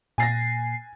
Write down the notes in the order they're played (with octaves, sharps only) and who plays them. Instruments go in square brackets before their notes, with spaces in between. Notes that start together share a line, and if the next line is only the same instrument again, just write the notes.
[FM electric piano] A#2 C7 [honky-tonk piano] G#5 A6 A#6